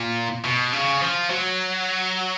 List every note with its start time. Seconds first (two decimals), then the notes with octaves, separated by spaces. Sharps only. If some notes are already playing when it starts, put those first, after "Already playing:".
Already playing: A#2
0.44 B2
0.73 C#3
1.01 F3
1.30 F#3